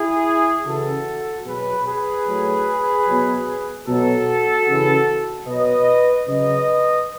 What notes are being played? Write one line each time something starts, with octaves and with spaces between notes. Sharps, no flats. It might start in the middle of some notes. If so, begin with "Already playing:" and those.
Already playing: E4 G#4
C#3 E3 F#4 A4
B2 F#3 G#4 B4
G#4 B4
A2 F#3
B2 F#3
B2 F#3 F#4 A4
C#3 E3
B2 F#3 B4 D#5
C#3 F#3 B4 D#5